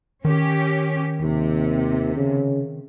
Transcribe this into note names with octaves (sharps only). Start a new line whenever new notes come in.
D#3 C#4 G4
D#2 C3
C#3